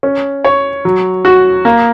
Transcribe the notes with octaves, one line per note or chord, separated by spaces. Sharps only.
C#4
C#5
F#3
F#4
A#3